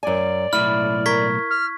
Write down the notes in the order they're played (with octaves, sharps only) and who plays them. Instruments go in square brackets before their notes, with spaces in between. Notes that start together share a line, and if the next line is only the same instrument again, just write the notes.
[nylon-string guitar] F#2 G#5 [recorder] D5
[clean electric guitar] B1 A2 B5 [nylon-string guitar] E4 [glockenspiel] F6
[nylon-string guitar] A#4 [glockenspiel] C#6 G#6 B6
[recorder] F6